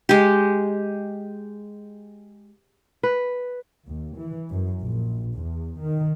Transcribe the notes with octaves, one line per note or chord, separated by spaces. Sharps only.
G#3 G4
B4
D#2
E3
F#2
A#1
E2
D#3